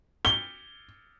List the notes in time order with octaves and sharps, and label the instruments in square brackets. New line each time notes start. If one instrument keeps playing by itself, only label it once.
[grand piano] G7